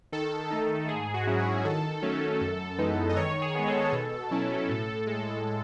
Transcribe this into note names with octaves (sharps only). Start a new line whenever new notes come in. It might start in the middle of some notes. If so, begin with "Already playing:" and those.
D#3 A4
A3 D#4
G#2 G#4
F#4
F#3 C#4 E4
G#4
D#3 A4
F#3 A3 C#4
F#2
E3 G#3 B3 D#4
D#5
D#3 C#5
G#4
G#3 B3
A4
B2
F#3 C#4 E4
A2
G#3